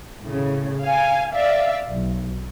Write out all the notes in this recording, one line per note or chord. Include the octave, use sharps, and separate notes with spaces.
A2 C#3
F5 G#5
D5 E5 F5
B1